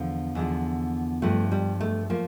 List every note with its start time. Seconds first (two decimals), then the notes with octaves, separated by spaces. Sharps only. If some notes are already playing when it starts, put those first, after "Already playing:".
Already playing: E2 D3 F3
0.35 E2 D3 F3
1.22 G2 F3 A3
1.52 G3
1.81 A3
2.10 F3 A#3